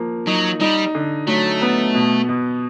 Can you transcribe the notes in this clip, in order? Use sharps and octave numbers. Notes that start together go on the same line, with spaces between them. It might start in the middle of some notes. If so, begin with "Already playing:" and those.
Already playing: F3 A#3
F#3 D#4
G3 D#4
D3
F#3 A3
B3
B2
B2